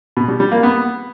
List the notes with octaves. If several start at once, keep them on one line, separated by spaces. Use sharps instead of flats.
B2
G3
G3
A#3
B3